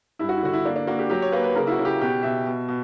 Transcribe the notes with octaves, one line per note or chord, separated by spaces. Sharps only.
G2 E4
F#4
E4
D3 F#4
E4
A#3 D4
D4
A#3 F#4
G4
F#3 G4
C#5
A#3 B4
B4
C#3 A#4
E4
F#4
C#3
G4
B2 G4
B2 E5
B2
B2